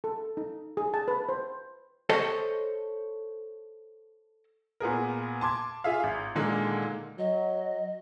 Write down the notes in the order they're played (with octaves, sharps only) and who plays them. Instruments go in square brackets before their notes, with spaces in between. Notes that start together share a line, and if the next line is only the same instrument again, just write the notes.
[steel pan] A4
D#4
G#4
A5
B4
C5
[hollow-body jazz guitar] A4 C5 C#5 D#5
[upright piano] A#2 B3 G#4 A#4
A5 C6 D6 G#6
F4 G#4 E5 F5
G#1
A#2 D3 D#3 G#3 A#3
[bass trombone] F#3 [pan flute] D#5